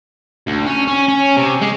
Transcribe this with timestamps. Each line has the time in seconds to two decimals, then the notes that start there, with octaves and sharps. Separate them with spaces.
0.47 D2
0.66 C#4
0.87 C#4
1.08 C#4
1.37 C3
1.62 G#3